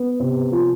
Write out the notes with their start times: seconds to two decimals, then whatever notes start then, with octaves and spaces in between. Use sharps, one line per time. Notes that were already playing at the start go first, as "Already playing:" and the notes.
Already playing: B3
0.20 C3
0.52 F3